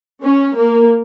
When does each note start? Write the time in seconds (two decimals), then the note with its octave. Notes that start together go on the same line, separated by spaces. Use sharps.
0.23 C#4
0.56 A#3